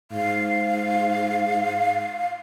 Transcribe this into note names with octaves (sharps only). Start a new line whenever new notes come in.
G#2 F5